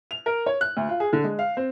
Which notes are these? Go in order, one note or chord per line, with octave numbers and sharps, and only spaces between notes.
F7
A#4
C#5
F#6
D2
F4
G#4
D3
G#3
F5
C4